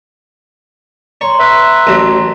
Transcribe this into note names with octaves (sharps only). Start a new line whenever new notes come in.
C#5 A#5 C6
B4 E5
A1 F#3